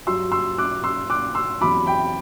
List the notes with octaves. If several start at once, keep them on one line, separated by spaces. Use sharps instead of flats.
G2 F#3 C6 E6
C6 E6
D6 F#6
C6 E6
D6 F#6
C6 E6
E2 C3 F#3 B5 D6
G5 B5